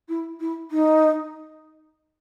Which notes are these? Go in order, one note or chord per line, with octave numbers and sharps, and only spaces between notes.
E4
E4
D#4